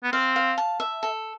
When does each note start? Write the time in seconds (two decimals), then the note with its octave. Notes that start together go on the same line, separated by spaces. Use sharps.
0.04 B3
0.13 C4 F5
0.36 F5
0.58 A5
0.80 E5
1.03 A4